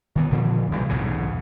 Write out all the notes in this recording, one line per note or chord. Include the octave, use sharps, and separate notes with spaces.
D#3 E3 B3
A#2 D3 F3
B1 C3 E3 G3
B1 E2 G#2 C#3